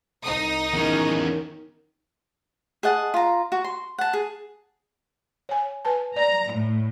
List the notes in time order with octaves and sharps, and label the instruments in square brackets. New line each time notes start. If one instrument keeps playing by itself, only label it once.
[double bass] C2 [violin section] D#4 D#6
[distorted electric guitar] E2 C#4 [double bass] D#3
[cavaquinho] G#4 D#5 F#5 A5
F4 A#5
F#4
C6
F#5 A5
G#4
[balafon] C#5 G#5
B4 G#5 A5
[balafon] D5 [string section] A#5
[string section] A2